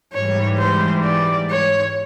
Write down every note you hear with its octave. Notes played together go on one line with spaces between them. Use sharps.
G#2 E3 G3 C#5
C5
D5
C#5